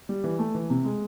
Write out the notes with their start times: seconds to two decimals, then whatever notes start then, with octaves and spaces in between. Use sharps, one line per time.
0.09 G3
0.24 E3
0.39 A3
0.55 E3
0.70 C3
0.85 G#3